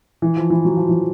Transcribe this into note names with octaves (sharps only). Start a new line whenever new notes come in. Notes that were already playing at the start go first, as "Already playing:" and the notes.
E3
F3
E3
F#3
F3
E3